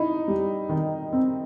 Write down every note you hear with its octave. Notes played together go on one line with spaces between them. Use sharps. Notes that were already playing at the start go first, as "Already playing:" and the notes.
Already playing: D#4 E4
G3
D#3
C4